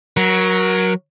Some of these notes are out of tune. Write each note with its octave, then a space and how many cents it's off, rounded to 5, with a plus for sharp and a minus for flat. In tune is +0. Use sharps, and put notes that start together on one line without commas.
F#3 +0 A#4 +25